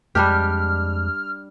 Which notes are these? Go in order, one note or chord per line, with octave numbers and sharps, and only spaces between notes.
F2 G3 G#3 D4 G4 F6